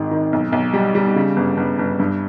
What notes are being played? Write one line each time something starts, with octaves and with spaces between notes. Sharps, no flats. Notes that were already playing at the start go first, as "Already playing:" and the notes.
Already playing: G#1 G#2 D#3
D#3
B1
B1
G3
G3
C#3
G1
G1
G1
G2